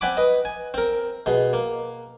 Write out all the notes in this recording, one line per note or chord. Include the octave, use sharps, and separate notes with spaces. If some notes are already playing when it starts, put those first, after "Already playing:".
C4 D5 F#5 G#5 B5 D6
B4 D#5
G#5
C4 A#4
B2 G#3
A#3